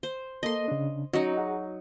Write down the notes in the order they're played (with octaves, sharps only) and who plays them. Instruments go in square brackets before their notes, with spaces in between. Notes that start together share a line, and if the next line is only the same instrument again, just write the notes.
[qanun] C5
[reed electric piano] A#3 A4 [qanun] D#5 C6
[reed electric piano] C#3 D4
[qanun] F#3 D#4 [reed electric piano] C#4 D#5
[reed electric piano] F#4 G#4 F#5